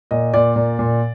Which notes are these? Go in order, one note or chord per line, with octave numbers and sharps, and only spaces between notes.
A#2 D#5
A#2 D5
A#2
A#2